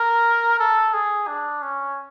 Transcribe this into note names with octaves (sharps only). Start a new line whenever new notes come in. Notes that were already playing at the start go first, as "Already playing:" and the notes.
Already playing: A#4
A4
G#4
D4
C#4